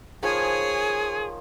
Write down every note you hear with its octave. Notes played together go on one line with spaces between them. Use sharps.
D#3 F3 G#4 C#5 G#5